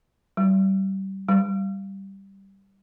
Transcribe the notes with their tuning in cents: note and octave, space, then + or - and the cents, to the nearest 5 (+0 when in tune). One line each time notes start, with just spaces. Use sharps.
G3 -25
G3 -5